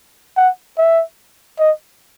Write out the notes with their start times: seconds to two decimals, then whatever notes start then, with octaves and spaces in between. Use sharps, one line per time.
0.37 F#5
0.78 E5
1.59 D#5